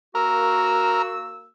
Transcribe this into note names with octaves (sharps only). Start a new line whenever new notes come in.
A#3 F#4 A#4 E6